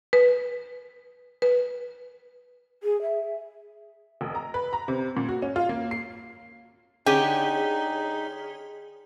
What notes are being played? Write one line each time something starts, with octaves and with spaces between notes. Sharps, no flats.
B4
B4
G#4
E5
F1
A#5
B4
A#5
C3
A#2
F#4
C#4
F4
A#3
C7
D3 C#4 D#4 G4 G#4 B6 G7